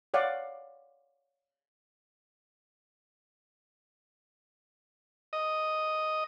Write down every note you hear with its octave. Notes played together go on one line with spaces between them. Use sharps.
C#5 D5 F5 F#5
D#5